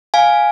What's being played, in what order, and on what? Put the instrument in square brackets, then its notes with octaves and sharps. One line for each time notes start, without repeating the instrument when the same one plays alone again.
[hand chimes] F5 G#5